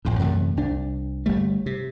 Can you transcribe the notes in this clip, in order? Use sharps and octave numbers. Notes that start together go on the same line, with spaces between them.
A1 F2 A2
F#2 C3 E3 A3
C2 D4
G1 G3 A3
C3